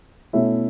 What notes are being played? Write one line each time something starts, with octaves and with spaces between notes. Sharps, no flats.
B2 A3 C#4 E4